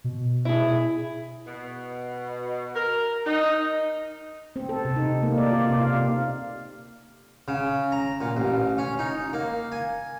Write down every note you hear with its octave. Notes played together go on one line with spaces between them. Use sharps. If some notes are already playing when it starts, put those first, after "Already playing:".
B2
E4 G#4
B2
A#4
D#4
C4
A4
C3
D#4
A#3
D5
F4
C3
F5
C4
C#3
A#5
A#2
A1
C#4
D#4
A#3
G#5